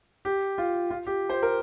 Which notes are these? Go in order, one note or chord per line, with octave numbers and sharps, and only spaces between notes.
G4
F4
F4
G4
C5
A#4